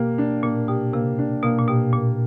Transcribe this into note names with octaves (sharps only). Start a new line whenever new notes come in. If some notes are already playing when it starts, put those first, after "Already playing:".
Already playing: B2 A#3 G4
D4
A#2 A#3
B2 G4
C3 A#3
D4
B2 A#3
A#2
B2 G4
A#2 A#3